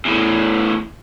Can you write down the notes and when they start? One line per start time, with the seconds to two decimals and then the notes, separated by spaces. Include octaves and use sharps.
0.05 E2 A2